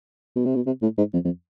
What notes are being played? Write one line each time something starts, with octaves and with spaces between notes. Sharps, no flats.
B2
C3
B2
C3
A2
G#2
F2
F2